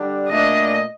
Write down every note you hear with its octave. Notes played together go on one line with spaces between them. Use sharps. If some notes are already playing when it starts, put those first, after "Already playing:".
Already playing: D3 G3 D4
A#2 A3 D4 D#5